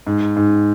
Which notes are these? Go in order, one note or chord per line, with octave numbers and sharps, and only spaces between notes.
G#2
G#2